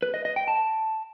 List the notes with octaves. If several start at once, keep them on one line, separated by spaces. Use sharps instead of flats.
B4
D#5
D#5
G5
A5